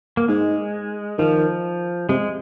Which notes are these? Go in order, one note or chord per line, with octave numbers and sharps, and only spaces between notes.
A#3
G#2 G#3
D#3 F3
C3 G#3